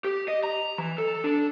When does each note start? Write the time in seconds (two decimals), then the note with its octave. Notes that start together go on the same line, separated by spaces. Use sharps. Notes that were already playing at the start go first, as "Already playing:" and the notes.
0.04 G4
0.28 D#5
0.44 A#5
0.78 E3
0.98 A4
1.24 D4